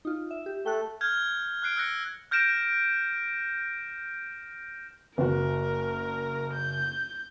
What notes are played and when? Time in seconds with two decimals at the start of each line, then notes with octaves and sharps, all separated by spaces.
0.05 D#4 F4
0.31 E5
0.46 G4
0.66 A3 G5 F#6
1.01 F6 G6 G#6
1.62 F6 F#6 C7 D7
1.76 E6 F#6 A#6 C#7
2.31 F6 G6 A#6 D7 E7
5.18 F#1 F#4 A#4
6.54 G6